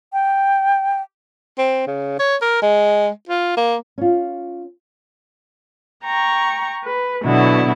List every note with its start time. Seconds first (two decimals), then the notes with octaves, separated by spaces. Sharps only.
0.13 G5
1.58 C4
1.87 C#3
2.19 C#5
2.42 A#4
2.62 G#3
3.29 F4
3.57 A#3
3.98 C#4 F4
6.04 G5 A#5 C#6
6.84 B4
7.24 B2 D3 F#3 B3 E4